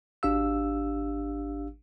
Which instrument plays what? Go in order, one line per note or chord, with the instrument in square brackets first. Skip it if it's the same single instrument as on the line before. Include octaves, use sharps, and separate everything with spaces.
[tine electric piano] G#1 D4 G4 F5 E6